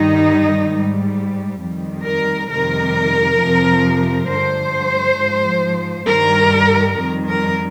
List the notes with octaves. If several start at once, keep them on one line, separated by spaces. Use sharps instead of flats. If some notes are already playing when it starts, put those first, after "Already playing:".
Already playing: G2 D#3 G3 D#4
G#2 G3
F2 D#3 G3
A#4
F2 C3 D#3 G3 A#4
F2 C3 F3
G2 D3 F3 C5
G#2 F3
G2 D#3 G3 A#4
F2 D#3 G3
A#4